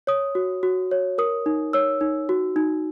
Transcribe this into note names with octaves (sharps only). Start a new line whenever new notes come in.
C#5 D#6
F#4
F#4
C#5
A#4 D#6
D#4
C#5 E6
D#4
F#4
D#4